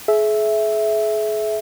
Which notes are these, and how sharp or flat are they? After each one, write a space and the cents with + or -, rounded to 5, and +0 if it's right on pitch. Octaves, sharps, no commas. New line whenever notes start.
G#4 +40 E5 +0